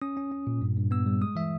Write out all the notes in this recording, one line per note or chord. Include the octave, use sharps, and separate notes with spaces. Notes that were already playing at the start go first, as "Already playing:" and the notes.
C#4 D#6
C#4
C#4
A#2
G2
G2
B3 E6
G3
G#3 D#6
E3 E5